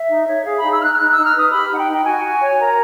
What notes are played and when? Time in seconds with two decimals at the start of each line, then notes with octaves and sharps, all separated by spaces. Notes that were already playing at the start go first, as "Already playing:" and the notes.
Already playing: E5
0.09 D#4
0.27 C#5
0.45 G#4 F5
0.58 B5
0.63 D#4
0.72 E6
0.80 D#4 F6 F#6
0.94 F6
0.98 D#4 F#6
1.12 D#4 E6
1.25 F6
1.34 B4 D#6
1.52 G4 B5
1.70 D#4 F#5
1.79 G5
1.87 D#4
1.93 G5
2.05 F#4 G#5
2.23 F#4
2.41 C#5
2.59 A#4 A#5